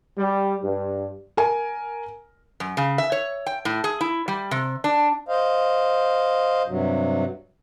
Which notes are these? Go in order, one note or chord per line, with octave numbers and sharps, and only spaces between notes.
G3
G2
A#4 G#5
F#2
C#3
E5
C#5
G5
A2
G#4
E4
G3
C3
D4
C5 D#5 F5
G2 C3 F#3